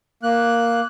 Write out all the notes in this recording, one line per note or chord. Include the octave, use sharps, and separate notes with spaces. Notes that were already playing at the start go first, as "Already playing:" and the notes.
A#3 F#6